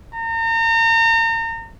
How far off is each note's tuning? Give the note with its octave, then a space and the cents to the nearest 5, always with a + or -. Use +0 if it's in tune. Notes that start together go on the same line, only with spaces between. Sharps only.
A#5 -35